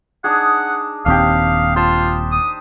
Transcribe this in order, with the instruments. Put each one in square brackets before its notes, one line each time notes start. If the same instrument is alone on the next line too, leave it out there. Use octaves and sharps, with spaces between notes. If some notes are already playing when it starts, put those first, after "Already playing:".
[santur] D4 D#4 G#4 [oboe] F#5
[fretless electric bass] D#1 D#2 C4 [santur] D4 D#4 G4 [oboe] F5
[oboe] F4 [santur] C5 A5
[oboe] D#6